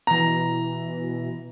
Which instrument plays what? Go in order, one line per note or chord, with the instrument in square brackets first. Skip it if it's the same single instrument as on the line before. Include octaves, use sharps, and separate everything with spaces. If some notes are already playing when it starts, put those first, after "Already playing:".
[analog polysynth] B2 E3 [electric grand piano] A#5